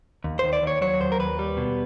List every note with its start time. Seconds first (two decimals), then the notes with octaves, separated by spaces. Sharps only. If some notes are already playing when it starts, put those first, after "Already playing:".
0.24 D#2
0.39 D#3 C5
0.53 D5
0.62 D#2 C#5
0.82 F#3 C#5
1.00 D#2 C5
1.12 A#4
1.19 D#2 B4
1.39 G3
1.57 B2